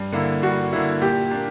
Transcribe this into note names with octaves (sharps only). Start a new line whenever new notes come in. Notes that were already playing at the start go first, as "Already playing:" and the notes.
Already playing: G2
D3 A#3 E4
G2 F#4
D3 A#3 E4
A#2 G4
A#3 D4